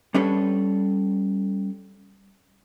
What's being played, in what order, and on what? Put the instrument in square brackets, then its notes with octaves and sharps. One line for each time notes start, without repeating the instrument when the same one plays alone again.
[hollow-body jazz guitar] G3 C#4 D4 A4 B4 C#5